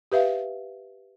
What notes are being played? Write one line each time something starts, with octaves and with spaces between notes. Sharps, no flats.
G4 B4 E5 F5